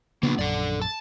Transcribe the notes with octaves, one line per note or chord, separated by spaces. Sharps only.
C#3 A#3 B3 D4 F4
A#1 F#2 A4 D5
A5